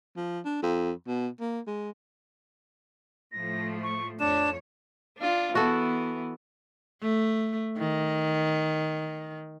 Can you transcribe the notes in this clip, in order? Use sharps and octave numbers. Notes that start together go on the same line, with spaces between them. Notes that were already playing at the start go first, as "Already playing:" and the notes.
F3
D4
F2
B2
A#3
G#3
A2 F3 A3 A#6
C#6
F2 D4 C#5 E7
D4 F4
E3 B3 F#4 A4
A3
D#3